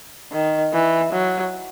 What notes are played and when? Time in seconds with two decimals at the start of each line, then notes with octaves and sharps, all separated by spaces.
0.32 D#3
0.73 E3
1.12 F#3